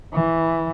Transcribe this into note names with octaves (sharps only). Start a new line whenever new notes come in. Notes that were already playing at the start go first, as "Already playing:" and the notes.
E3